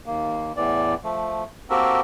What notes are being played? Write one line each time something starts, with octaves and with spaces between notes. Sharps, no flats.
D#2 A#3
E2 A2 E3 D5
F3 A3
A#3 C4 F#4 G4 A4 A#4